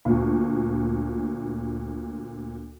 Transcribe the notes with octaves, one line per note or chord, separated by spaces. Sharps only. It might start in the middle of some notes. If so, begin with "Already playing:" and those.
D2 A#2